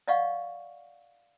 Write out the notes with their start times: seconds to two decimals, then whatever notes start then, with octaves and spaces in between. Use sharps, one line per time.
0.08 D5 D#5 F5 F#5 C#6